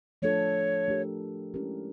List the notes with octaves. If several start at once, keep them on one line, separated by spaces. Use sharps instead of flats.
F3 A3 D4 F4 A4 C#5
A3 D4 G4 A#4
G#3 C#4 E4 G4 A#4